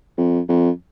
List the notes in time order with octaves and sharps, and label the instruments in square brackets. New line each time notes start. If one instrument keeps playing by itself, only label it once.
[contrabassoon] F2
F2